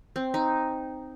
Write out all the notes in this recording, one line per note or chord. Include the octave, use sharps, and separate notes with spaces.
C4
D#4